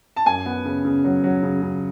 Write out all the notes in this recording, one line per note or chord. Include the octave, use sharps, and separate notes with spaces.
A5
F#2 G#5
B3
C#3
C#3
F#3
F#3
C#3
C#3